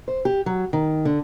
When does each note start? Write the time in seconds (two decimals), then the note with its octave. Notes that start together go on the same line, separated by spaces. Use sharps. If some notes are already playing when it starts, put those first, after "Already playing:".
0.08 C5
0.25 G4
0.46 F#3
0.73 D#3
1.05 D3